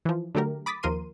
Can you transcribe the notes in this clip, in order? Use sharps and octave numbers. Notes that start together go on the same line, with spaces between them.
E3 F3
D3 F#3 A3 G4 A#4
B5 D6 D#6 A6 B6
D#2 F3 A#4 C6 D#7